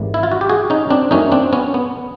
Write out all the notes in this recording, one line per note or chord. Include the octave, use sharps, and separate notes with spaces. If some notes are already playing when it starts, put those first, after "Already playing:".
Already playing: G#1 G#2 E3 G3 A#3
E4
F4
F#4
G4
F#4 G#4
C#4 D#4
C4 D4
F#2 D#3 F#3 A3 C#4 D#4
C4 D4
B3 C#4
B3